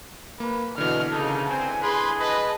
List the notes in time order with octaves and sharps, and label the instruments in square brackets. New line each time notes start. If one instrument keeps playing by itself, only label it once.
[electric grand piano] A#3 [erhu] B4
[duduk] B2 [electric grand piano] D3 E3 [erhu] F6
[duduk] C#3 [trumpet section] A#3 D#4 [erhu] A4
[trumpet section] C4 [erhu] G#5
[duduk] G#4 [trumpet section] B4 C6
[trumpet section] B4 D#5 [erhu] A5